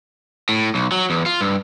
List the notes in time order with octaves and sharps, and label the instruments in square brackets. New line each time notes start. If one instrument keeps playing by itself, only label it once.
[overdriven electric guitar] A2
B1
F#3
E2
F4
G2